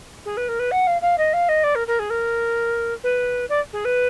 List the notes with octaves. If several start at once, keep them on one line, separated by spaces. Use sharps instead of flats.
G#4
B4
A#4
B4
F#5
F5
F5
D#5
F5
D#5
D5
A#4
A#4
G#4
A#4
B4
D5
G#4
B4